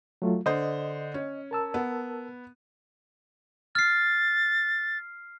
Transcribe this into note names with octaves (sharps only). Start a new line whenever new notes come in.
F#3 A3 F4
D3 C5 D#5
C#4
A#4 A5 E6
B3
F6 A6 C7